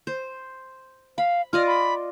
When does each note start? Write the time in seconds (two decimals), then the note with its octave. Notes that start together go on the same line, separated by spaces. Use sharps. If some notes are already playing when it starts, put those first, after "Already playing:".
0.07 C5
1.18 F5 B5
1.53 F4 D5 D#5 F6
1.67 B5